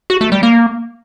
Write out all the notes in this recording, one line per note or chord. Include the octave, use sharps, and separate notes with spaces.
F#4
A3
G3
A#3